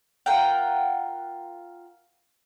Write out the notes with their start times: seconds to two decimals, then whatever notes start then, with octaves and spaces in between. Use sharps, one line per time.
0.26 F4 A#4 F#5 G5